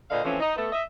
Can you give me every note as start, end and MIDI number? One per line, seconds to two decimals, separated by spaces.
0.11 0.22 46
0.11 0.22 50
0.11 0.22 71
0.11 0.22 72
0.11 0.22 75
0.11 0.22 77
0.24 0.39 52
0.24 0.39 53
0.24 0.39 57
0.24 0.39 60
0.24 0.39 61
0.24 0.39 65
0.40 0.56 63
0.56 0.68 57
0.56 0.68 59
0.56 0.68 69
0.73 0.82 75
0.73 0.82 76